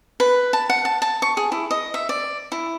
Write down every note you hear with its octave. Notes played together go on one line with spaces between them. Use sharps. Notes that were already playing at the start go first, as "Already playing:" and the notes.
B4
A5
F#5
A5
A5
C#6
G#4
E4
D#5
E5
D5
E4